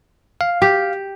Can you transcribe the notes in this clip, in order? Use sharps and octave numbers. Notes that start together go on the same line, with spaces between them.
F5
G4